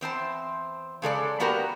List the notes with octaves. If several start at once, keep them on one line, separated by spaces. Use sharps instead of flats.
E2 C4 C5 A5
C#3 G#3 A4 D5
A#3 B3 F#4 G4 A#4